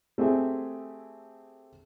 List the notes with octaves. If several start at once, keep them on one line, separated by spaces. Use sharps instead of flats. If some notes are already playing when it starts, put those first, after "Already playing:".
A3 C4 G4 G#4 E5